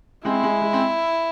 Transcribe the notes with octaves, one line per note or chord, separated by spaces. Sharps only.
G#3 C4 E4
G#3
G#3
C4